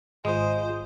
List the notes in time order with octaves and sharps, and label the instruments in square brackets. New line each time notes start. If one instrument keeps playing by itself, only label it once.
[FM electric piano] G#1 D#6 [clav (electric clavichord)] G#3 [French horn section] F4 [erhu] C5